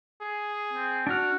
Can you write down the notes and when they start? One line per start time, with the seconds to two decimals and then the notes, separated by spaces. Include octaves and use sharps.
0.21 G#4
0.73 C4
1.07 D4 F#4 F6